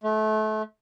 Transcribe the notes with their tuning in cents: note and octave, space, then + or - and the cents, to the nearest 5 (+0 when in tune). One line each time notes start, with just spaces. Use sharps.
A3 -30